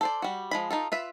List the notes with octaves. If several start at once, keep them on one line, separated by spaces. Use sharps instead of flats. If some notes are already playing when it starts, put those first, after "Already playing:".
A4 C5 D5
G3 F#4
F3 G#3 B5
D#4 F4 A4
F4 B4 E5